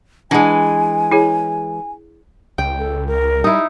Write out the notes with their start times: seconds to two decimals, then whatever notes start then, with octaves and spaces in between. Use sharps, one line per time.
0.31 E3 G#3 D4 F#5 G#5 A5
1.12 E4 G#4 C#5
2.58 C#2 G5
2.79 A4
3.07 A#4
3.44 G3 D#4 E4